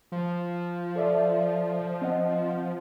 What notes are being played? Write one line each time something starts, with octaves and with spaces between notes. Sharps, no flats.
F3
A4 D5 E5
C4 D#5 F#5